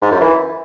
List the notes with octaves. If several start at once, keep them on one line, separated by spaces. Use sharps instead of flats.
G#2
F#2
E3